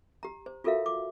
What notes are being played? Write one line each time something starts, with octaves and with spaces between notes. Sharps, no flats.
G4 A#5
C5
F4 F#4 A4 A#4 E5 F5
D6